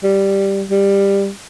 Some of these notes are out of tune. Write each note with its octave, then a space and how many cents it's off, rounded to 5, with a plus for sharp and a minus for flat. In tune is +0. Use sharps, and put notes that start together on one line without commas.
G3 +0
G3 +15